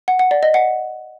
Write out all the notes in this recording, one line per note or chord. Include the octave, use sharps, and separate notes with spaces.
F#5
F#5
D5
D#5
F#5